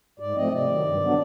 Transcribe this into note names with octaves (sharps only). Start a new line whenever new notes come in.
G#2 D5
F3 A3 C4 D#5
C3 D5
D#3 F#3
G2
D3 F#3 B3 D4